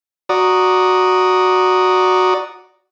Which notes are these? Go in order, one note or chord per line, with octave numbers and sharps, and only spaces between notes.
F#4 D5 A#5 D#6